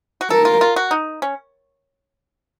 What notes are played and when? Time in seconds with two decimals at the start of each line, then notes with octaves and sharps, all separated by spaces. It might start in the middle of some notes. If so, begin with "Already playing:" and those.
0.21 F#4
0.30 A4 A#4
0.45 F4
0.61 F4
0.76 F#4
0.91 D#4
1.22 C#4